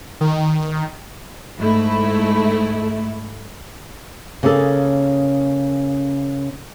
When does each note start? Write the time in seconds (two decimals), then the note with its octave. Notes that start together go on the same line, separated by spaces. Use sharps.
0.21 D#3
1.58 G#2 A3 E4
4.43 C#3 A#3 C#4 G#4 A4